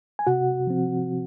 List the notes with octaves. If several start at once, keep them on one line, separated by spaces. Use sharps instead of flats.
G#5
C3 F#4 F#5
F3 C4